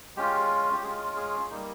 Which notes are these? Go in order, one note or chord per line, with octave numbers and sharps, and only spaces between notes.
G#3 C#4 F4 G4
G4
G#3 C#4 F4 G#4
G#4
G3 A#3 D#4